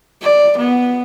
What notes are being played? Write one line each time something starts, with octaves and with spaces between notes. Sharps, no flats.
D5
B3